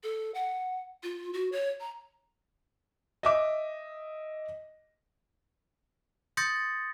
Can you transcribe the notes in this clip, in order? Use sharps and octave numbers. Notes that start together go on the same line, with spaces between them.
A4
F#5
F4
F#4
C#5
A#5
D#5 E5 D6
C6 D#6 G6 A6 A#6 C#7